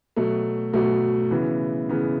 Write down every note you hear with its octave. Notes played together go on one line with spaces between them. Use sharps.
B2 F#3 A3
B2 F#3 A3
C#3 E3 B3
C#3 E3 B3